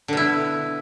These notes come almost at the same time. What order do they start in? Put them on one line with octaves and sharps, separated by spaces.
D3 B2 E4